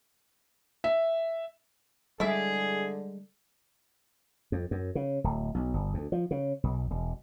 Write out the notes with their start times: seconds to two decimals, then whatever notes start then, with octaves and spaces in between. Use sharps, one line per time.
0.84 E5
2.20 D3 G3 G#3 E4 G#4 D5 E5
4.52 F2
4.71 F#2
4.95 C#3
5.24 D1
5.55 B1
5.74 G1
5.94 D2
6.12 F3
6.31 C#3
6.63 B1
6.91 E1